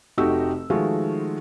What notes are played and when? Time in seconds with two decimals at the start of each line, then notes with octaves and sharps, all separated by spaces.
0.18 F1 A3 D#4 F#4 G4 E6
0.70 D#3 F3 G#3 A3 F4 F#4